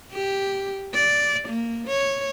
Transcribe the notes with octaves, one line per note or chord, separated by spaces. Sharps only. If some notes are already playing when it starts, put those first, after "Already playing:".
G4
D5
A#3
C#5